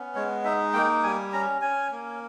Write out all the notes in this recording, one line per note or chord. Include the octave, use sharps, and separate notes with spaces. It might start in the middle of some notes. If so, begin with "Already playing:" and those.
Already playing: B3 C#4
G#3 C#5
D#4 E5
A#3 G5
G3 G#5
C#4 A#5
C#4 G#5
A#3